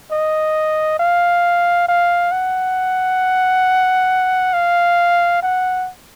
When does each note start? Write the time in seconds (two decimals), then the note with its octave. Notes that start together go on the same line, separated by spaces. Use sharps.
0.12 D#5
1.00 F5
1.89 F5
2.32 F#5
4.53 F5
5.43 F#5